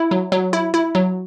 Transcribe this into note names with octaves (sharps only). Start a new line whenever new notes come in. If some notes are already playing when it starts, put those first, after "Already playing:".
Already playing: E4
F#3
F#3
E4
E4
F#3